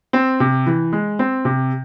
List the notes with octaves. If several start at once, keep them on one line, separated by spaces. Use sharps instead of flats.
C4
C3
E3
G#3
C4
C3